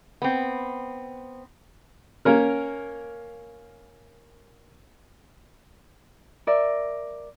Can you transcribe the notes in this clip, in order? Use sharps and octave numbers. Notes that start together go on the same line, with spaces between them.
B3 C4
A#3 C#4 A#4
A#4 D5 E5